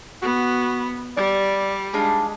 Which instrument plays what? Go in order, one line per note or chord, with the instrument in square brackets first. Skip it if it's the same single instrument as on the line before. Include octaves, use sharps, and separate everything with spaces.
[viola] B3 [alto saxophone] F#4
[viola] G3 [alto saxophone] D5
[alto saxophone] G#3 [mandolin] D4 D#4 F4